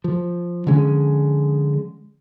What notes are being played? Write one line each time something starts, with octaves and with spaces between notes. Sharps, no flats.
F3
D3 F3 G#3 C#4